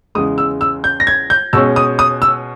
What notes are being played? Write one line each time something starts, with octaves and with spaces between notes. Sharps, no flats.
E2 C#3 G#3 D#6
E6
E6
G6
A#6
G#6
G6
B2 G#3 C#4 E6
D#6
D#6
E6